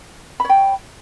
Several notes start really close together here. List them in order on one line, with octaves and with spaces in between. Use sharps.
B5 C#5 G5